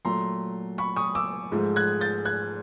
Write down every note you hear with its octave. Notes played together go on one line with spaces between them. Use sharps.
A#2 F#3 A3 A#5 C6
B5 C#6
C#6 D#6
D6 E6
G#2 F3 A3
F#6 G#6
G6 A6
F#6 G#6